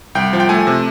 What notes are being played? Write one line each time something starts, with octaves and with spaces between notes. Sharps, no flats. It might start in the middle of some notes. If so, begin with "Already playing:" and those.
C2 G5
F3
G5
A3 G#5
C3